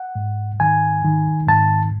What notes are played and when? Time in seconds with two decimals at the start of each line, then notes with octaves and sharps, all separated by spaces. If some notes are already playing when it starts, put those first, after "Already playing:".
Already playing: F#5
0.15 G#2
0.60 D#3 G#5
1.05 D#3
1.47 G#2 A5